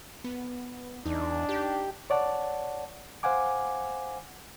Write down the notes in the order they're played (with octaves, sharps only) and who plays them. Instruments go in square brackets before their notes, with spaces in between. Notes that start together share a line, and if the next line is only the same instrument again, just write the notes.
[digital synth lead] B3
[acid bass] E2 [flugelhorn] D4 [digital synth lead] D#4
[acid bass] G4
[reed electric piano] C#5 D5 F#5 A5
C5 F5 F#5 G#5 D6